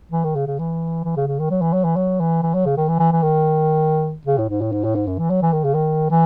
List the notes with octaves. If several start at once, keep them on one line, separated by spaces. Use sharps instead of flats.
E3
D#3
C#3
C#3
E3
E3
C#3
C#3
D#3
F#3
E3
F#3
E3
F#3
E3
E3
F#3
C#3
D#3
E3
E3
E3
D#3
C#3
A2
G#2
A2
G#2
A2
G#2
F#2
E3
F#3
E3
D#3
C#3
D#3
E3